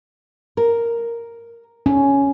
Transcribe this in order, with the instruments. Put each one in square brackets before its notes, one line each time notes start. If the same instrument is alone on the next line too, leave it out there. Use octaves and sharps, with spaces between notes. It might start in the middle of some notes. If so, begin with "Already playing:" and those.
[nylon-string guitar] A#4
[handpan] C#4